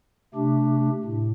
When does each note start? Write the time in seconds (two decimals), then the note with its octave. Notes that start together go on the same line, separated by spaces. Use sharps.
0.34 C3 A3 D4 G4
1.03 A2